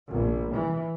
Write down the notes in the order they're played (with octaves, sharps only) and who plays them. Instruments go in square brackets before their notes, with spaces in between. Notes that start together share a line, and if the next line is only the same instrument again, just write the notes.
[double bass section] A#1
E3